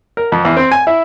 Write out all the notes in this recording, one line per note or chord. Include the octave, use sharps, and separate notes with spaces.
A#4
F2
E2
C4
G#5
E4